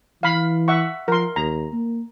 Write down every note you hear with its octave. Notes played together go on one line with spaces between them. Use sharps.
E3 F5 B5
E5 F#5 C#6
F3 A#4 C6
D#2 A#5
A#3